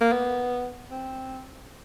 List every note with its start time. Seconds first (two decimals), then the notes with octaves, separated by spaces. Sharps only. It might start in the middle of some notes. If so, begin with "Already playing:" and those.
0.01 A#3
0.12 B3
0.91 C4